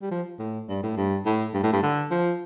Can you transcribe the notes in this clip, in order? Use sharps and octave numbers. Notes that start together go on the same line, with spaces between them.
G3
F3
A2
G2
A2
G2
A2
G2
A2
G2
D3
F3